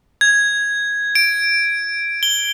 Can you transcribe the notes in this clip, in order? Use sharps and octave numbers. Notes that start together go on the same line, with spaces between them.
G#6
D7
G7